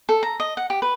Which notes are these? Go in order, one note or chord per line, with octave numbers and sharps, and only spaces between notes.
A4
A#5
D#5
F#5
G4
B4